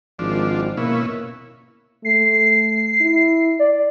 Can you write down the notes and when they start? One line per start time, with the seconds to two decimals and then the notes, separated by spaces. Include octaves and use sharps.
0.19 G#1 F3 D4
0.77 B2 A#3 C#4 E4
2.05 A3 C7
3.01 E4
3.59 D5